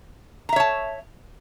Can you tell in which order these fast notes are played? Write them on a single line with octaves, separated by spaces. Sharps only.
A#5 E5 C#5 A5